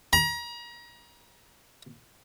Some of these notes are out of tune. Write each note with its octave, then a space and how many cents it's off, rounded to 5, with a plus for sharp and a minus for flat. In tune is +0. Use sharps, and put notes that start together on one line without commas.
A#5 +35